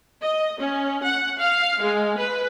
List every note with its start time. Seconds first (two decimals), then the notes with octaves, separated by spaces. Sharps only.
0.21 D#5
0.59 C#4
1.02 F#5
1.37 F5
1.80 G#3
2.17 B4